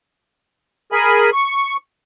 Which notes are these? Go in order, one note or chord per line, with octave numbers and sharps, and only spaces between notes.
G#4 A#4 G#5 B5
C#6